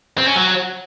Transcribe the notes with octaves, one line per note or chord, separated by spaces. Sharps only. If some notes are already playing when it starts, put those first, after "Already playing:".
C4
C#4
F#3